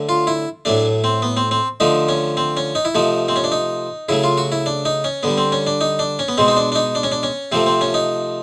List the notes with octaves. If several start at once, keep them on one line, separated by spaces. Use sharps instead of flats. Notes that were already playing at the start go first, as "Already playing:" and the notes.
Already playing: D3 F#3 A3
F4
E4
A2 F#3 A3 D4
C4
B3
C4
C4
D3 F3 A3 D#4
C#4
C4
C#4
D#4
E4
C3 F3 A3 D#4
C4
C#4
D4
D#4
C#3 F#3 A3 E4
F4
F#4
E4
D4
D#4
C#4
D3 G3 B3
C4
C#4
D4
D#4
D4
C#4
B3
B2 G#3 C4
D#4
D4
D4
D#4
D4
C#4
D4
C#4
C3 F3 A3 C4
C4
C#4
D#4